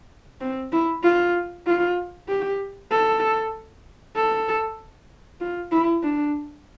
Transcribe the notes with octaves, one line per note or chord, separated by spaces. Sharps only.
C4
E4
F4
F4
G4
A4
A4
F4
E4
D4